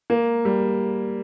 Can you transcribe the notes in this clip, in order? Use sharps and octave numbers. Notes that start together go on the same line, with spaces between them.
A#3
G3